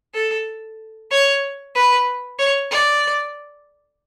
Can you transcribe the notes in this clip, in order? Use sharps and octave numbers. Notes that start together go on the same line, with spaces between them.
A4
C#5
B4
C#5
D5